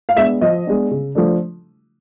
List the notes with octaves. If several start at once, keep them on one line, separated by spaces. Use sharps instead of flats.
F5
G#3 B3 D4 E5
F3 D#5
G#3 B3 D4
C#3
F3 A3 D4